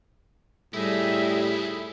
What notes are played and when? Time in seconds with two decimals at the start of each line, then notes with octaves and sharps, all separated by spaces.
0.74 A2 G3 D#4 E4 G#4 E5